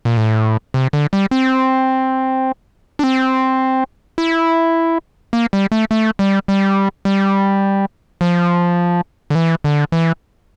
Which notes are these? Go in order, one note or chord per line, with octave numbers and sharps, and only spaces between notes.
A#2
A2
C3
D3
G3
C4
D4
C4
E4
A#3
G3
A3
A3
G3
G3
G3
F3
D3
E3
D3
E3